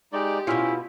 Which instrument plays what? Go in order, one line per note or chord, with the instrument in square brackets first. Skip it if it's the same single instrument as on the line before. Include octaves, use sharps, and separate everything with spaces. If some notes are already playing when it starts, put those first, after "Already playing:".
[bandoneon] G#3 D#4 D5 [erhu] G4
[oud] B2 F4 [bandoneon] C#4 [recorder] E4